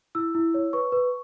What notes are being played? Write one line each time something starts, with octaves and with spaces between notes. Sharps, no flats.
E4 E6
E4
C#5
B4 C#6
B4